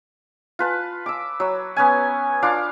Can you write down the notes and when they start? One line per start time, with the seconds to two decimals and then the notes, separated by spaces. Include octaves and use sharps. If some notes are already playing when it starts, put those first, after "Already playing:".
0.59 F4 B4 A5
1.06 D6 E6
1.40 F#3 E6
1.76 B3 C#4 G#5
2.42 D4 F4 F5 D6